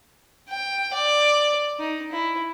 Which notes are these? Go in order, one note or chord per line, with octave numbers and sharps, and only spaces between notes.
G5
D5
D#4
E4